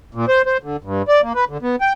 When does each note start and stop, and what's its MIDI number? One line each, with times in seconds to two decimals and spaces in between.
0.15 0.26 46
0.28 0.42 72
0.46 0.57 72
0.63 0.77 50
0.84 1.02 43
1.08 1.21 74
1.22 1.33 58
1.35 1.45 71
1.49 1.58 50
1.62 1.76 59
1.81 1.93 79